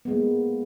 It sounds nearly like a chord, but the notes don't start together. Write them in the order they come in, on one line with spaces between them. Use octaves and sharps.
B3 G#3 A#3